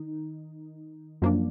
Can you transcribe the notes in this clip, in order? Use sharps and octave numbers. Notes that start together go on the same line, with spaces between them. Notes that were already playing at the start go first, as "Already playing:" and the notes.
Already playing: D#3 D#4
F#2 F3 A#3 D4